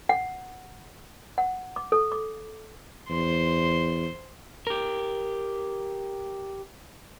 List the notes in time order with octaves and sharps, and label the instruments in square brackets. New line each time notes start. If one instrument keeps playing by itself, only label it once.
[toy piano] F#5
F#5
D6
A4
D6
[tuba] E2 [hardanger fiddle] C5 C6
[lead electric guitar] G4 A#4